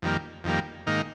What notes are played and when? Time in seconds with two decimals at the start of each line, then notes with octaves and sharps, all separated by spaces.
0.02 F2 D#3 G3 A#3
0.44 F2 D#3 G3 A#3
0.87 G#2 D#3 A#3 D#4